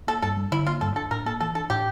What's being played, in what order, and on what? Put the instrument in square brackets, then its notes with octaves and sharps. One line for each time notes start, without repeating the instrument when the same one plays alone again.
[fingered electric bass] A#3 [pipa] A4
[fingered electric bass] G2 [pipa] A4
[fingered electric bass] G3
[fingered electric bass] D3 [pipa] E4
[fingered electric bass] A#3 [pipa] F4
[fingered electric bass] G2 [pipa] A4
[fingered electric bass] D4 [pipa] A4
[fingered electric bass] A2 [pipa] A#4
[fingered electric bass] A#3 [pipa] A4
[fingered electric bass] E3 [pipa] A4
[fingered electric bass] D4 [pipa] A4
[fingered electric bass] A2 [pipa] G4